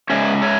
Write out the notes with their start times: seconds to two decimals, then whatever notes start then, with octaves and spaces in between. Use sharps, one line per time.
0.10 C#3 G#3 C#4 C#5 E5
0.42 C#5 E5